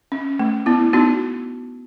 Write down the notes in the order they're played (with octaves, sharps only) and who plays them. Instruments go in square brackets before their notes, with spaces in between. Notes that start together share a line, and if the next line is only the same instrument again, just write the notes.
[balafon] C#4
A3
B3 E4
B3 D#4 F#4